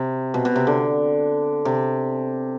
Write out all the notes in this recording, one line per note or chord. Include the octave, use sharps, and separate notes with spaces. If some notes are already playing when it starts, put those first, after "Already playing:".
Already playing: C3
B2
B2
C3
D3
C3